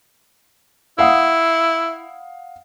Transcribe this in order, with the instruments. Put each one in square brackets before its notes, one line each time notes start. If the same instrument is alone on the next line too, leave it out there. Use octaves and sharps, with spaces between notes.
[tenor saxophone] E4 [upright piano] F5 F#5 D#6